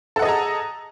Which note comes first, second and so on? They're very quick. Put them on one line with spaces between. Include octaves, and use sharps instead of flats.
A4 F#5 D#5 G#4 A#5